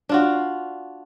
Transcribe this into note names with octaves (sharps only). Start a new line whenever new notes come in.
D4 F4 F#4